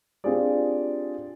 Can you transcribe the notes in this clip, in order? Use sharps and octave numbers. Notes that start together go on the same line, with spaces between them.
C4 D4 F4 G4 G#4 D5